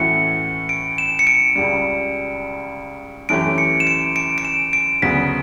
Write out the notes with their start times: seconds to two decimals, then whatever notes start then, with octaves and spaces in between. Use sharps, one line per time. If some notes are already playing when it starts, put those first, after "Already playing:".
Already playing: A2 E3 A3 C#4 F#4 C#7
0.69 D7
0.98 E7
1.19 C#7
1.27 D7
1.55 C#2 C#3 G3
3.29 F#2 E3 A3 C#4 G4 D7
3.58 C#7
3.80 E7
3.87 D7
4.16 D7
4.38 D7
4.45 E7
4.73 D7
5.02 D2 C#3 F#3 B3 B6